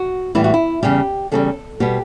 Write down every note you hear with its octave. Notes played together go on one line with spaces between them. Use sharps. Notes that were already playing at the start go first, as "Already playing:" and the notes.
Already playing: F#4
A2 E3 G3 B3 E4
F#4
E4
E2 C#3 G3 G4
E2 C#3 G3 A4
B2 G3 B3 G4